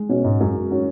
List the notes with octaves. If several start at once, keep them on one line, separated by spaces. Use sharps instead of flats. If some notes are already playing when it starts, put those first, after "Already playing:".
Already playing: G#3
B2 C#4 F#4 C#5
G#2
F#2 G#3
C#4 F#4 C#5